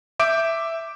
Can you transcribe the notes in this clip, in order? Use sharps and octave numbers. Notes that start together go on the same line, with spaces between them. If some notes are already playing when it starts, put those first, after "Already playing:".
E5 D6 G6 D7